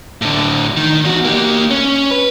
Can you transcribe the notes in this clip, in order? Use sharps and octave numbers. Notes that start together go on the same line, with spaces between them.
A2 D3
D#3
E2 F#4
A#3 G4
C#4
B4